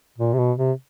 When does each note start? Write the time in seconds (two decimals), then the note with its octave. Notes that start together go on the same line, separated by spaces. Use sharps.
0.18 A#2
0.33 C3
0.38 B2
0.58 C3